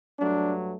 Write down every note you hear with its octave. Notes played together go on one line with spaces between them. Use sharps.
G2 F#3 A3 D4